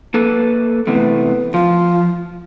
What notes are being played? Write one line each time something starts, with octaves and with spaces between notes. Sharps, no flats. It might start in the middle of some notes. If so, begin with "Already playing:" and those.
A#3 A4 B4
C3 E3 A3 B3
F3 F4